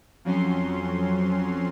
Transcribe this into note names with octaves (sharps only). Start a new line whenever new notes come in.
F2 F#3 C#4 C6